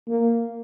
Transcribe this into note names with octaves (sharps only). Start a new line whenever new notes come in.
A#3